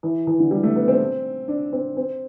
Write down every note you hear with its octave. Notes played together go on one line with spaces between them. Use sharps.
E3
E3
D3
G3
A3
B3
C4
D4
C4
C4